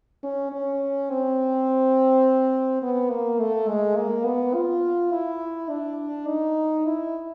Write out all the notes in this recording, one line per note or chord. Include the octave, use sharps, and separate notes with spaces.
C#4
C#4
C4
B3
A#3
A3
G#3
A#3
B3
F4
E4
D4
D#4
E4